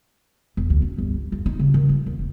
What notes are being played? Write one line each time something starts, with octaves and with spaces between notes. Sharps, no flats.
E1
D2
C#4
G1
E3
F2
D#4
C#3
D#3
F3
D#2
E1